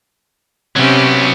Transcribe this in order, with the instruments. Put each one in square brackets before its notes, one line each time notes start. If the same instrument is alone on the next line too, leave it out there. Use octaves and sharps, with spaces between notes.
[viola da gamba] C3 C#4 G4 [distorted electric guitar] F#3 B3